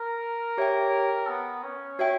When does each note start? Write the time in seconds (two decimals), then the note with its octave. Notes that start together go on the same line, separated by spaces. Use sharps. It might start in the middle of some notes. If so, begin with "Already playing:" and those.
Already playing: A#4
0.58 G4 C#5 E5 G5
1.28 B3
1.63 C#4
1.99 F#4 C#5 E5 G5